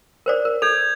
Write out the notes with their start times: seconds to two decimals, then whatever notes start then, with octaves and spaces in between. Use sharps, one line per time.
0.26 A#4 C5 D5
0.45 A#4
0.62 A4 G6 G#6 F7